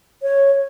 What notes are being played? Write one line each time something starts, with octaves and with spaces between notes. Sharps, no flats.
C#5